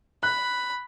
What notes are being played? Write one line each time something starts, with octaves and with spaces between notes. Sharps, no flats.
B5 F#6